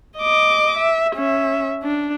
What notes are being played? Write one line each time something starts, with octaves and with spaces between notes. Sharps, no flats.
D#5 D6
E5
C#4 E5
D4